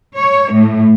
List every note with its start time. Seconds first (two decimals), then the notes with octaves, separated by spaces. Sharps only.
0.16 C#5
0.53 A2